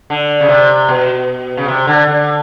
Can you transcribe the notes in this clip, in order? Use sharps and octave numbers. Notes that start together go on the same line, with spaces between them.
D3
C#3
C3
B2
C#3
C3
D3
D3